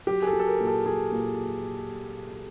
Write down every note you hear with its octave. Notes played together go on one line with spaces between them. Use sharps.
F#3 G4
G#4
A4
F#3
A4
A#4
A#2
A4
F#3 G#4
A#2